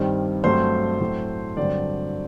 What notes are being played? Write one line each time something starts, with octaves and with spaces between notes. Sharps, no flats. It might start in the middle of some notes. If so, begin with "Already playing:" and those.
Already playing: G2 D#3 G3 C4
G2 F#3 A3 C4 C5 C6
A2 F#3 A3 C4
G2 D3 F#3 C4 D5